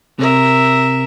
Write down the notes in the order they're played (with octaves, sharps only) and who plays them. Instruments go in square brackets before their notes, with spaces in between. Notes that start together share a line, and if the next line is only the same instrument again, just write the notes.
[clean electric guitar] C3 [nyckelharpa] A#4 E5